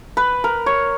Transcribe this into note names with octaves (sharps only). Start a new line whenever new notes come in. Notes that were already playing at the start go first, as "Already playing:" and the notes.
B4
A#4
C#5